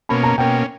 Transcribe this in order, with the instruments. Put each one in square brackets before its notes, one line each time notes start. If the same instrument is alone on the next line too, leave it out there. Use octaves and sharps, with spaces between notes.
[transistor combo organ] B2 A#3 C#4 [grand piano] B5
[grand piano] A#5
[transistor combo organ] B2 A#3 C#4 [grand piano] G5